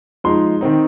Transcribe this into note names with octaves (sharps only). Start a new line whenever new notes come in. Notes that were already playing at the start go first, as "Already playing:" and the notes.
F3 G#3 D#4 C6
D#3 C4 D#4